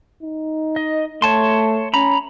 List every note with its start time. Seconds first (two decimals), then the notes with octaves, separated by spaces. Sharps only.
0.23 D#4
0.76 D#5
1.22 A3 C#5 A5 C6
1.94 C#4 A#5 B5